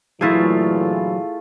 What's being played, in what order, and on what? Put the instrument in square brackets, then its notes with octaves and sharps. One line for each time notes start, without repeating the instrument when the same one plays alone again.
[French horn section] A#2 D3 E3 [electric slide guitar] F#3 [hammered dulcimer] A3 F4 [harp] E4 G#4